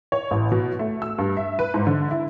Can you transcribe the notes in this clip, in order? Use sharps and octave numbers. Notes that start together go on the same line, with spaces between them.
C#5
A1
B2
A3
E6
G2
E5
B4
G#2
D3
E4